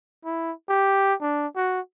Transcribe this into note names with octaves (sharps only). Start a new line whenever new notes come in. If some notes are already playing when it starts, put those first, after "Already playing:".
E4
G4
D4
F#4